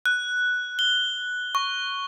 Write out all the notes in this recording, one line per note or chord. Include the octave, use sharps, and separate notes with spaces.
F#6
G7
C#6